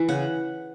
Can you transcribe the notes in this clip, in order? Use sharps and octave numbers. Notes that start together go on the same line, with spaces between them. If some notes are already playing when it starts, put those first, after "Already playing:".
Already playing: E3
C#3 F#5